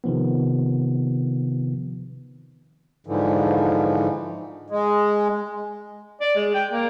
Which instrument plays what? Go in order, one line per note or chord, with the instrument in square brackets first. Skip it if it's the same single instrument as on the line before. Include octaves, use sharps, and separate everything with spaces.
[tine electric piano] C3 D#3 F3 B3
[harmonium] G#2 D3 E3 F3
[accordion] G#3
[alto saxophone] D5
G#3
G5
A#3